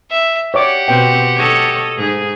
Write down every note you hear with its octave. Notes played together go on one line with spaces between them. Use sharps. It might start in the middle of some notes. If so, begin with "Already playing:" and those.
E5
G4 C#5 D5 F#5 D6
B2 C4 G5
A4 C#5 D#5
G#2 G#4